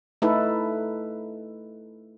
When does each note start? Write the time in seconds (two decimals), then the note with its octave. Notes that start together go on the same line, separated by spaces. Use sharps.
0.22 A3 D#4 E4 A4 B4